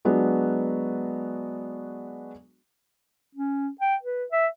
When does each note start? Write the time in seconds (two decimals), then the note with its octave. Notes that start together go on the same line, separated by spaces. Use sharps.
0.05 F#3 G#3 B3 D4 F#4
3.35 C#4
3.81 G5
4.03 B4
4.32 E5